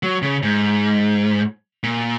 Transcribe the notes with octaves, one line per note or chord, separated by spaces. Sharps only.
F#3
C#3
G#2
A#2